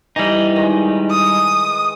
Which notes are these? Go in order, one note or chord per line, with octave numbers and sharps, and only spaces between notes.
E3 G3 D#4
D#3 G#3
D#6